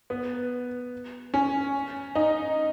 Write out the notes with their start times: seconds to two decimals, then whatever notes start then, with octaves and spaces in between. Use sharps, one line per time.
0.10 B3
1.34 C#4
2.15 D#4